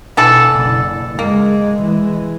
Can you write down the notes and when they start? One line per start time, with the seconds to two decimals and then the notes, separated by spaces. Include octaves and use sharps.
0.17 B2 D3 E3 A4
0.54 F#1
1.19 G#3 A#3
1.83 E3 G#3